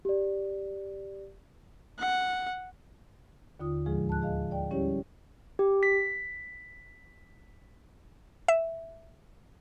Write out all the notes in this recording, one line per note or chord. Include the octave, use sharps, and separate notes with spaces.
G4 D5
F#5
D#2 D3 F4 D#6
D2 A2 F3 G#3 G#4
A5 F#6
G#4 D#5 F5
D5 G5
G3 C#4 E4 G4 C#5
G4
B6
E5